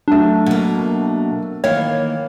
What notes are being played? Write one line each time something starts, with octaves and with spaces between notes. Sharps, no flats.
F#3 A3 D4
B2 A#3
D#3 E3 A#3 C#5 F5